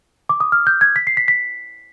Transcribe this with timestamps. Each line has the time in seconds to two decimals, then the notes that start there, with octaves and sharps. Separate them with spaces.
0.29 D6
0.40 D#6
0.52 F6
0.67 G6
0.81 G#6
0.96 B6
1.07 C7
1.17 B6
1.28 B6